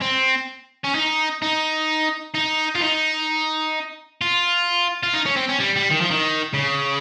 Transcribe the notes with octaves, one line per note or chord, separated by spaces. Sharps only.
C4
C#4
D#4
D#4
D#4
F4
D#4
F4
F4
D#4
C#4
C4
C#4
G3
G3
D#3
F3
D#3
C#3